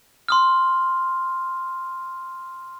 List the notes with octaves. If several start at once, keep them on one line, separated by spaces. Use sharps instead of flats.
C6 D#6 F6